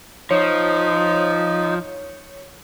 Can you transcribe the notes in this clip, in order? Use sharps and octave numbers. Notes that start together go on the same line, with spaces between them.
F3 D#4 C#5